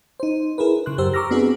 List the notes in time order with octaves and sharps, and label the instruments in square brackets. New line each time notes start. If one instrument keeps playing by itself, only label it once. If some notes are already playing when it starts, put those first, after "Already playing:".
[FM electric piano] D#4 C5
E4 G#4 A#4 B4
C#3 C6 F#6
F#2 G4 A#4 C5 E6
A#5 C#6 D6 E6 F6 A#6
B3 C4 D4 F#4 G#4 B4